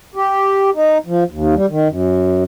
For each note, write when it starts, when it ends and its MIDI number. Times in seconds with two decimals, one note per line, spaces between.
0.15 0.70 67
0.75 0.98 63
1.06 1.24 53
1.30 1.55 39
1.55 1.66 55
1.70 1.88 51
1.88 2.44 42